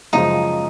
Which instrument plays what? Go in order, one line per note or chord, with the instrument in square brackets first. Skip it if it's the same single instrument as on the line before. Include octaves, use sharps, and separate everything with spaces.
[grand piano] F#2 C#3 F3 G#3 [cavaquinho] D#4